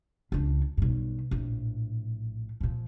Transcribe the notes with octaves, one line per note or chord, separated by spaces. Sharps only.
C#2 D4
B1 G2
A#1 A2
A#2 F3